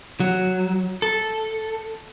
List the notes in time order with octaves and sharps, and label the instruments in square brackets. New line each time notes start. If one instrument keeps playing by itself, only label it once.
[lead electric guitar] F#3
A4